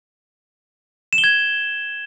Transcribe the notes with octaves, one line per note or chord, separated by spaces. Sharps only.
E7
G7
G#6